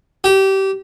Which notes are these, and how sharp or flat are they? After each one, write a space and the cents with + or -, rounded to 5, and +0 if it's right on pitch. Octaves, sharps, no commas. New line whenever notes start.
G4 -25